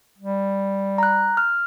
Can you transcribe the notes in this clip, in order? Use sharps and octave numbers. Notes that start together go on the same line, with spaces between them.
G3
A#5 F#6
F6